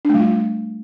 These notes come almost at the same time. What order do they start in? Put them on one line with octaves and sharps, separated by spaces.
D4 A3 G3 F4